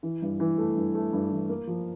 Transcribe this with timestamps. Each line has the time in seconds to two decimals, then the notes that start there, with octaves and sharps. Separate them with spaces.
0.03 E3
0.22 G2
0.40 E3
0.58 A3
0.76 G2
0.95 A3
1.13 G2
1.31 E3
1.49 A#3
1.67 F3